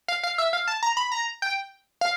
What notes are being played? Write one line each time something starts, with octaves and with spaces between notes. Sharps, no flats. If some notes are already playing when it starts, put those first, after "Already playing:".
F5
F5
E5
F5
A5
A#5
B5
A#5
G5
F5